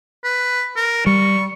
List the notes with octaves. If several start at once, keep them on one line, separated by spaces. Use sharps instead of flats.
B4
A#4
G3 C#6